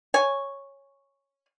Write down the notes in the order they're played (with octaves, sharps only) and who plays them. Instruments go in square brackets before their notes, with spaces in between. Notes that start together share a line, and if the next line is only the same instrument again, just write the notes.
[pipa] C#5 G#5